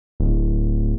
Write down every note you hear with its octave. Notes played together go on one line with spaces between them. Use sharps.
D1